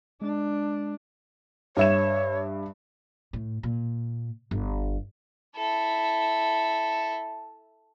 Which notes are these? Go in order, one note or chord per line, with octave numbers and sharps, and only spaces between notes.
G#3 D4
G2 C#5 E5 E7
A2
A#2
G1
E4 A4